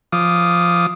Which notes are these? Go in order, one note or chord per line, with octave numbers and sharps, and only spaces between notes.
F3 D6 D#6